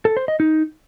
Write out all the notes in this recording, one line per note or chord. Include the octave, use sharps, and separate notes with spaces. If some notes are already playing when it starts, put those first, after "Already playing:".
A4
C5
D#5
D#4